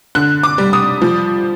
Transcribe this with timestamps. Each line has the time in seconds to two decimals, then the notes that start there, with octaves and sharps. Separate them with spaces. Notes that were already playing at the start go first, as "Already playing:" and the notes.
0.15 D3 F#6
0.43 D6
0.58 G3
0.73 D#6
1.02 F3